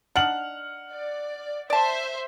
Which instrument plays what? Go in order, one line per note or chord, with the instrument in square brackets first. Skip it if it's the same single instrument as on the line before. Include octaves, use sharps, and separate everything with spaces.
[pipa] D4 D#4 [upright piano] F#5 F6 F#7
[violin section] D5
[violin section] C5 E5 [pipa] D5 A5